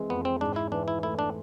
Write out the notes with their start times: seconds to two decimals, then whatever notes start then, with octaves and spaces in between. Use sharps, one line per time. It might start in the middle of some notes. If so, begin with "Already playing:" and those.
Already playing: E3 G#3 C4
0.09 F2 B3
0.25 C4
0.41 G#2 D4
0.56 E4
0.72 E3 D4
0.88 E4
1.03 A3 E4
1.19 D4